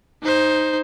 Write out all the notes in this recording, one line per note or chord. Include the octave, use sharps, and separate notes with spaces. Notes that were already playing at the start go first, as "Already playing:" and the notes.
D#4 C5